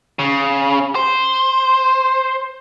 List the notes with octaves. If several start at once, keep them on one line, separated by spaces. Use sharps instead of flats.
C#3
C5